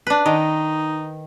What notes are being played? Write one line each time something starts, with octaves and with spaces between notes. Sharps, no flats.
D4 B4
D#3 D#4